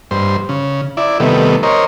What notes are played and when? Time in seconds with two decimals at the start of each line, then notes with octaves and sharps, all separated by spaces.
0.11 G2 C5
0.49 C#3
0.97 E4 D5
1.20 C3 D#3 G3 A3 B3
1.63 A#4 C5 C#5 D#5